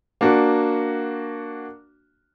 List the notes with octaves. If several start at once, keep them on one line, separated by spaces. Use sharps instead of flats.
A#3 D4 F#4